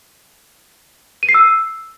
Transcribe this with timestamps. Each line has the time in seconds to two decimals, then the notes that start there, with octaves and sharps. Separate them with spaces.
1.23 D#7
1.29 C7
1.34 E6